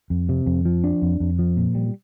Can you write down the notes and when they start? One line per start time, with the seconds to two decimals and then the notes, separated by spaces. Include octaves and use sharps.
0.10 F2
0.29 C3
0.46 F2
0.65 F3
0.84 D4
1.02 F2
1.20 F2
1.39 F3
1.57 A#2
1.75 G3